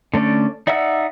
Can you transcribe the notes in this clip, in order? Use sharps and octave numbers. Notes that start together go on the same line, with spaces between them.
D3 A3 C#4 D5
D#4 D5 E5 F#5 E6